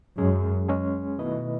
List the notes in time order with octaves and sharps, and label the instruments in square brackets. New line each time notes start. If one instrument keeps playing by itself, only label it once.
[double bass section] F#2 [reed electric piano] G#3 C#4 G#4
[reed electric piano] G#3 C#4 G#4
[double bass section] B2 [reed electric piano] D#3 A3 E4 B4 D#5